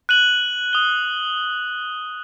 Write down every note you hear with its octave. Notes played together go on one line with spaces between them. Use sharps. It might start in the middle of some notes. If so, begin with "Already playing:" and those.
F#6 D#7 F#7
D#6 G7